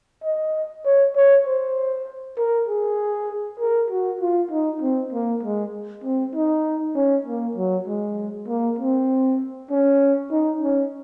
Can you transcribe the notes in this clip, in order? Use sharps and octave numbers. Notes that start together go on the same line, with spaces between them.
D#5
C#5
C#5
C5
A#4
G#4
A#4
F#4
F4
D#4
C4
A#3
G#3
C4
D#4
C#4
A#3
F#3
G#3
A#3
C4
C#4
D#4
C#4